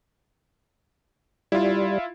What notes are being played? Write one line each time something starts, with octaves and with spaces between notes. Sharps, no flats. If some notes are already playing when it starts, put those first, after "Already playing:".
G3 E4 F4